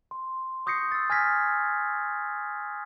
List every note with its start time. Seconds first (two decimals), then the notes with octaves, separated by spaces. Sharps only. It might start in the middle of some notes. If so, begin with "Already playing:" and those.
0.11 C6
0.66 C#6 D#6 G6 A#6 C7 C#7
0.92 E6 A6
1.10 G#5 F6 G#6 A#6 B6